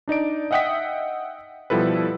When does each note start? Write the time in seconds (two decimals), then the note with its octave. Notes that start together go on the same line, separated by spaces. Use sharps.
0.08 D4 D#4 D5 D7
0.51 D#5 E5 F#5 G5 D#6 B6
1.70 B2 F3 G3 E4 A4 B4